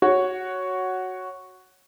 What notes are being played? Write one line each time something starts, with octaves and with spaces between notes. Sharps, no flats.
F#4 C#5